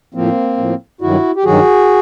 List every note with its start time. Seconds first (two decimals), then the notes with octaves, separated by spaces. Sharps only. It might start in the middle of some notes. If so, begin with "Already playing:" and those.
0.14 A2 F3 A#3 C4
0.57 A2 F3
1.01 G2 D#3 F#3 E4 F#4
1.36 G4
1.45 G2 D#3 F#3 F#4 G#4